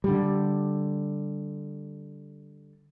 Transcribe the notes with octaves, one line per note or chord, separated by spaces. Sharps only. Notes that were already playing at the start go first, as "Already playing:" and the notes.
D3 G3